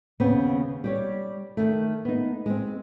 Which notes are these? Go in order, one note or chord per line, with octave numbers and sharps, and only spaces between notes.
D#2 C#3 B3 C4
G3 G4 C#5
D#3 A3
B3 D#4
G#3 C4